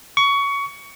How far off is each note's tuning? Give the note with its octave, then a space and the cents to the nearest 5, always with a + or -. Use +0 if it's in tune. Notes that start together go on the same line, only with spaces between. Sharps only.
C#6 +20